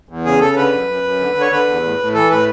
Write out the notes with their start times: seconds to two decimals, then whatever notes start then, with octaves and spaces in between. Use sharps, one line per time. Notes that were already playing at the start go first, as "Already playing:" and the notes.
0.09 E2
0.25 C#3 G#4
0.41 C#3 A4
0.56 D3 B4
0.72 F#2
0.88 F#2
1.03 F#2
1.20 D3
1.35 D3
1.41 C#5
1.52 D3 B4
1.67 E2
1.83 A2
1.99 A2
2.14 E3 A4
2.30 A2 B4